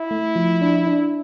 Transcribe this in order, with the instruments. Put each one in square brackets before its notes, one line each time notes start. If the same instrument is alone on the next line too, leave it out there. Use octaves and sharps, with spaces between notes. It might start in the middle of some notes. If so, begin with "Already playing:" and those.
Already playing: [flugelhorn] E4
[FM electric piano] A3
F3
D4
D4